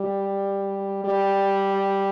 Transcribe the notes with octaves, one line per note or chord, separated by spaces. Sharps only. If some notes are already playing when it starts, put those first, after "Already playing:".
Already playing: G3
G3